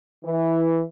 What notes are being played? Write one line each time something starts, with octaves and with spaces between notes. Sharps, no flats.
E3